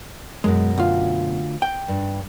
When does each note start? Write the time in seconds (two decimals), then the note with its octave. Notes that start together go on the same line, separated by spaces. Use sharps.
0.44 F#2 B2 G#3
0.78 D2 F4
1.62 G5
1.88 G2